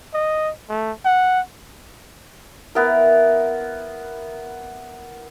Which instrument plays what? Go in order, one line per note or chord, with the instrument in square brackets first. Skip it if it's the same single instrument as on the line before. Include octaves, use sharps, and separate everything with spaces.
[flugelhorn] D#5
A3
F#5
[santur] B3 E4 A#4